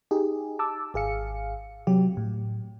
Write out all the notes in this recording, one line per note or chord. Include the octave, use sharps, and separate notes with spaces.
D#4 G4 G#4
A5 D6 E6
G#1 G#4 F5 C#7
C3 F#3 G4
A2